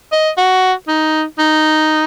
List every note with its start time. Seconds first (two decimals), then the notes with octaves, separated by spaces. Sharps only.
0.12 D#5
0.37 F#4
0.88 D#4
1.39 D#4